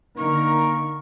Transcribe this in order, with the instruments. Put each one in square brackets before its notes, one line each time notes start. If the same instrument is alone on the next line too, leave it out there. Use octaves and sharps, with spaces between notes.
[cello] D3 [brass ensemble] A#3 D#4 A#4 [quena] C#6